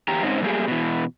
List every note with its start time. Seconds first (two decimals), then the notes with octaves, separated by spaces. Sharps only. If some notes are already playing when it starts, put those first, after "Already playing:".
0.08 E2 G4 A#5
0.23 G#2 C4 C#4 D#4
0.42 F#3 G3 A3 A#3 G4 G#4
0.68 B2 E3